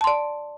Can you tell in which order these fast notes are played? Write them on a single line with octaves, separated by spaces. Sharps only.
A5 C6 D5